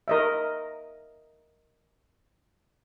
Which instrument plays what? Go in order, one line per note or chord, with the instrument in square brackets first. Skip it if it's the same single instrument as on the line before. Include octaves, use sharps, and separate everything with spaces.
[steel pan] A#4 D#5 E5